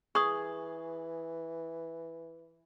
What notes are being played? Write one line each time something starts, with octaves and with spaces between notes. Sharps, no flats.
E3 G#4 C#6 D#6